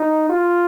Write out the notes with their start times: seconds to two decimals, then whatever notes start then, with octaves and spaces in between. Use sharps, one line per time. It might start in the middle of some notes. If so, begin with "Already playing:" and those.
Already playing: D#4
0.29 F4